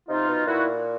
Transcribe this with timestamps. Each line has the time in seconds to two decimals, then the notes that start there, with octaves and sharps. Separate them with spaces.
0.09 C3 D#4 F4
0.28 B2
0.46 A#2 E4 F#4